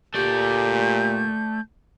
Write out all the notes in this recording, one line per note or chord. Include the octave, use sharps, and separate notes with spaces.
A#2 A3 G4 D5 G6